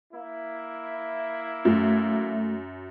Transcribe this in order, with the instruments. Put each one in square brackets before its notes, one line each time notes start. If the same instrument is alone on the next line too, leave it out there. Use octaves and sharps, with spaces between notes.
[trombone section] A#3 E4
[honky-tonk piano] F#2 [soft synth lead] A3